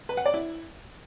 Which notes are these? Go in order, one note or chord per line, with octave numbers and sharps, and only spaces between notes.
B4
F#5
D5
E4